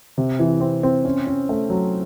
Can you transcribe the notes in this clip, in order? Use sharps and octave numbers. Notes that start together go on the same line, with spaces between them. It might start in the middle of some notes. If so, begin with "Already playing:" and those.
C3
E3
C4
C4
C#4
C#4
A3
F#3